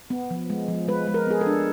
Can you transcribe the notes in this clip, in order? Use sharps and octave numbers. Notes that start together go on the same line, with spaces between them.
B3
F3
G#3
F3
G#3 B4
G#3
A#4
B3 G#4
A4
D4